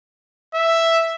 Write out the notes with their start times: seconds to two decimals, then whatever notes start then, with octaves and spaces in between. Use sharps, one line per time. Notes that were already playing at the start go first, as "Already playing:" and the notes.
0.55 E5